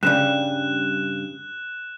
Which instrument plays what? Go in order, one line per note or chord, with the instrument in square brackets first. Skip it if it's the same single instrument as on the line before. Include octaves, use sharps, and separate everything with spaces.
[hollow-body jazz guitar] G2 C#3 G3 [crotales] F#6 E7